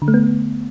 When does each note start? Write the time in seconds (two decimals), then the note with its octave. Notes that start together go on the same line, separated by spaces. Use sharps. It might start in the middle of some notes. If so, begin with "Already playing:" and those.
0.02 D3
0.08 A3
0.14 B3